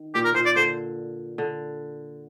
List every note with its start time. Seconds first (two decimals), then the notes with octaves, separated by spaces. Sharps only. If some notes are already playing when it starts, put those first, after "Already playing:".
Already playing: D#3
0.15 A#2 G4
0.25 A#4
0.35 A#2 C5
0.46 D5
0.56 D3 C5
1.38 D3